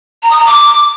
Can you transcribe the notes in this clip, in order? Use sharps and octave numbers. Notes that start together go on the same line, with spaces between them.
A#5
D#6
A#5
D6